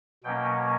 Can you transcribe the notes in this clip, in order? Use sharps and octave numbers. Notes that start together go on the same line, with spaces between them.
B2 F#3 A#3 C#4 G5